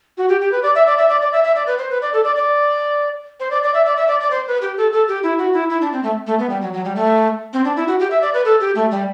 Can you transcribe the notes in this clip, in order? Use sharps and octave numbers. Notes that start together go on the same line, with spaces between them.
F#4
G4
G4
B4
D5
E5
D5
E5
D5
D5
E5
E5
D5
B4
C5
B4
D5
A4
D5
D5
C5
D5
D5
E5
D5
E5
D5
D5
C5
B4
G4
A4
A4
G4
E4
F#4
E4
E4
D4
C4
A3
A3
B3
G3
F#3
F#3
G3
A3
C4
D4
E4
F#4
G4
E5
D5
B4
A4
G4
A3
G3